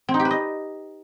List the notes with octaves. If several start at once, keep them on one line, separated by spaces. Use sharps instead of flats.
C4
D#4
G4
B4
D#5